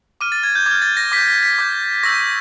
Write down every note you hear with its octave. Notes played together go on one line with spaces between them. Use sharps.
D6 F6 D#7
A6
G#6
G6
D6 F6 G#6
A6
A#6
D6 G6 B6
B6
B6
D6 G6
C#6 E6 G6 A#6